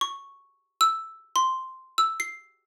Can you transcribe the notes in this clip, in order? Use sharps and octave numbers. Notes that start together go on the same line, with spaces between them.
C#6
E6
C6
E6
C7